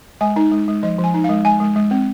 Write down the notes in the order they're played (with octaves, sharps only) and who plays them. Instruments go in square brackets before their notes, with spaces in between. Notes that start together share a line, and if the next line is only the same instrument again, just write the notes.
[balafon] G#3 G#5
D#4
G#3
G#3
F3 D#5
F3
G#5
D#4
F5
G#3
G#3 G#5
G#3
G#3
C4